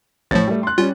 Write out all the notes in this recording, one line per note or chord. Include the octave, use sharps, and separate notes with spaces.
A1 A2 F3 C#5 A6
G3 A3
C6 F#6
G3 C#4 F4